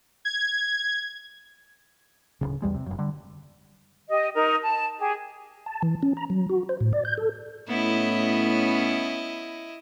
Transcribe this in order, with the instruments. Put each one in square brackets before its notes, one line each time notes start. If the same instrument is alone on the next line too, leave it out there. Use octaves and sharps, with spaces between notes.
[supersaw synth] G#6
[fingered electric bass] D1 C#2 C#3
B1 E2 G3 G#3
C3
F#1 F#2
D3 G3
[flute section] G4 D#5
D#4 A#4
A5
G4 G#4
[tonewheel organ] A5
E3
C#4
A#5
F#3
F#4
C5
A2
D5
G6
A4
[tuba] A2 [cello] B3 C#4 [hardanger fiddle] E4 D#5